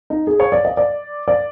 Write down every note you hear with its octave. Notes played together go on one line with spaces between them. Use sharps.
D#4
G#4
C#5
D5
D#5
D5
D5